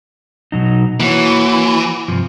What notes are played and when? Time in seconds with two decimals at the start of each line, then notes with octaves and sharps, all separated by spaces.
0.52 B2 F#3 D#4
1.00 E3 A#3 F#4 C#5
2.08 G2 C3 F3